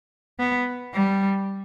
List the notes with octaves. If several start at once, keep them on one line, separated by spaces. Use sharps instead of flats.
B3
G3